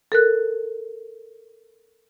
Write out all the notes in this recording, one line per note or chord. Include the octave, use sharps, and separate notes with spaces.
A4 A#4 F#6